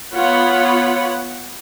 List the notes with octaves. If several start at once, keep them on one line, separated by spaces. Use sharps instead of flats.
B3 F4 C#5 F#5 B5